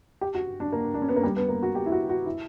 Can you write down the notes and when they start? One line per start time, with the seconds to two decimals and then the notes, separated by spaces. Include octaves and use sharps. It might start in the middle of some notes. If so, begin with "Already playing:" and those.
0.21 G4
0.35 F#4
0.60 D4
0.73 A#3
0.94 D4
1.02 C#4
1.09 B3
1.16 A#3
1.23 G3
1.36 B3
1.49 A#3
1.63 F#4
1.75 G4
1.86 E4
1.92 F#4
2.09 F#4
2.26 E4